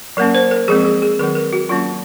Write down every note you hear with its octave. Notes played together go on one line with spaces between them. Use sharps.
F#3 A#3 C#4 A#4
C5
A#4
F3 G#3 C4 G#4
G#4
G#4
D#3 F#3 C4 A#4
A#4
F#4
F#3 A#3 C#4 F4